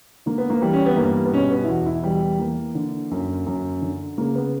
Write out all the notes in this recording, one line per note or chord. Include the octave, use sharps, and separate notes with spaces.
D3 A#3
B3
A#3
E3 G3
C#4
B3
G2 A#3
B3
B2 C#4
B3
E4
E2 F#4
E4
E3 G3
E3 A#3
D3
F#2
F#2
D3
C#3 A#3
B3